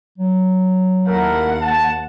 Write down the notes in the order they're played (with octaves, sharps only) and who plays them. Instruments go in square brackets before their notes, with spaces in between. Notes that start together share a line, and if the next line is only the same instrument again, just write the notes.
[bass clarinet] F#3
[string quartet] D#2 F#5 [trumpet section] A3 E4 A#4
[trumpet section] A5